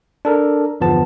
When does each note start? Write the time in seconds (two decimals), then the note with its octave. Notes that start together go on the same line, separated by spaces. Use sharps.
0.25 D4 A4 A#4
0.81 G1 E2 F3 B3 A5